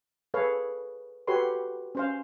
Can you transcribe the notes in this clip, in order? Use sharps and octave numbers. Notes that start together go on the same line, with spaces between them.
G#4 A4 B4 C#5 F5
F#4 G4 A4 B4 C#5 C6
C#4 C5 F5